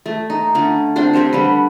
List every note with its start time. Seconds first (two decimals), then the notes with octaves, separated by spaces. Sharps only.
0.06 A3
0.30 D#4
0.55 D3 A3 C#4
0.96 C4 D4 C5
1.13 C4 G4 C5 C#5
1.33 D3 G3 B4